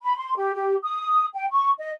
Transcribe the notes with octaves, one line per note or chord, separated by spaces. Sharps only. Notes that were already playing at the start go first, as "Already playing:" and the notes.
B5
C6
G4
G4
D#6
G5
C#6
D#5